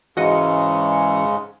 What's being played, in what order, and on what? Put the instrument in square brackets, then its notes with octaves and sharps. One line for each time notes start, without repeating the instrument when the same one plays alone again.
[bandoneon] G#2 C#3 G#3 [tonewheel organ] E3 C#4 [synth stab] F#4 D#5 C#7